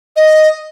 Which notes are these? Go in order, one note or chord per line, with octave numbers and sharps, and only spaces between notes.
D#5